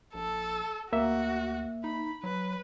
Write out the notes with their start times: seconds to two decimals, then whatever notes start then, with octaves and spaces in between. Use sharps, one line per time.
0.14 A#1 A4
0.93 D2 A#3 F#4 E5
1.84 D#4 B5
2.23 F#3 B4